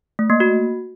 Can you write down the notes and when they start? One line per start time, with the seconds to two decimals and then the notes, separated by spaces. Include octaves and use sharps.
0.19 A3
0.30 A#3
0.40 F#4